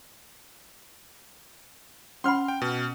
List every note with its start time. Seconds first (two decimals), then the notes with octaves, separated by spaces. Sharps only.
2.24 C#4 F#5 B5 C6 F6
2.48 G5
2.62 B2